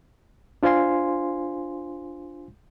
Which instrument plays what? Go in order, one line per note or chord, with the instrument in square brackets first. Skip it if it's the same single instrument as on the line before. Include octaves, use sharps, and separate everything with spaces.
[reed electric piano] D4 F4 C5 F5 G#5 C6